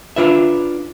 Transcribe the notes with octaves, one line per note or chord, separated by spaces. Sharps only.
D4 F4 B4 E5